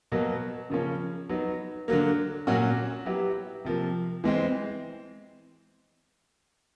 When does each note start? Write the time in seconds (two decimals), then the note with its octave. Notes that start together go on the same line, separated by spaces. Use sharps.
0.12 B2 F#3 A#3
0.70 C#3 F3 A#3 C#4
1.29 F#3 B3 D#4
1.88 D3 F#3 A#3
2.47 A#2 F#3 A#3 C#4 F#4
3.06 F#3 B3 E4 G4
3.65 C3 F3 A#3
4.24 E3 G#3 C4